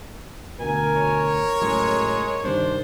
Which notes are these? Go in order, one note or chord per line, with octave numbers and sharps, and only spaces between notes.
D2 B2 A#4 G#5
C#5
F#2 A2 C#3 G#3
G2 C3 D#3 D4 C5